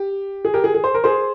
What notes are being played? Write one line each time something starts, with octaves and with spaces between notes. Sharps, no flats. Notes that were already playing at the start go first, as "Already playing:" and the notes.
Already playing: G4
G#4
G4 A#4
G#4
G#4
C5
A#4
G#4 C5